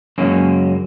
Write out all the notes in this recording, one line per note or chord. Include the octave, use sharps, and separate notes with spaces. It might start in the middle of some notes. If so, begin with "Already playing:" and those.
F#2 C#3 F#3 G#3 A#3 C#4